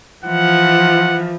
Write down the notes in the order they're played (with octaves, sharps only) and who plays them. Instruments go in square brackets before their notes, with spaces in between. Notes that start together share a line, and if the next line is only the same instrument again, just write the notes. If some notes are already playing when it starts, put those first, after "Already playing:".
[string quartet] E3 F3 [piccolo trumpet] F#5